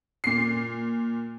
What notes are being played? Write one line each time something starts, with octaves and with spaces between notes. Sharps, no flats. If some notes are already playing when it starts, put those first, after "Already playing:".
A#2 C7